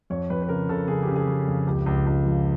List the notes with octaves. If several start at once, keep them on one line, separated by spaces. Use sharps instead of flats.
F2 C#5
F2 B4
B4
C#3 A#4
C#3 A4
C#3 G#4
G4
C#3
G#4
C#3
F2
C#2 G4
C#2
C#2
F3